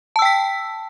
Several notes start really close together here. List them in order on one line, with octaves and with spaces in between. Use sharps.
A5 E6 G5 B6